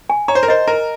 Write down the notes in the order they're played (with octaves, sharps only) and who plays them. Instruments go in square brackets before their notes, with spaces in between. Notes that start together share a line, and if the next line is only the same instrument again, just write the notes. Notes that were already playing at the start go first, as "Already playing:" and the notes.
[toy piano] G#5
[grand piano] C#5 [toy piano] A#5
[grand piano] C5
A#4
[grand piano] C5 [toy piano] D#5
[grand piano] A#4 [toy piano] A#5